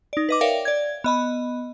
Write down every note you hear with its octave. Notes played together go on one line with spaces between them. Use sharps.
D#4 D5
B4 D#5 D6
A#4 C#5 D5 E5 F5 G5
D5 G#6
B3 D#5 B5